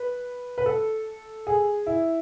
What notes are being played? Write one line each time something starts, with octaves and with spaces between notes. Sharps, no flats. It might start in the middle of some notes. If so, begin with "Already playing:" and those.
Already playing: B4
B4
A4
G#4
E4